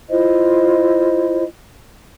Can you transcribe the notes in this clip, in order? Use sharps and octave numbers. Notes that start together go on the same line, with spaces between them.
E4 F4 C5 D#5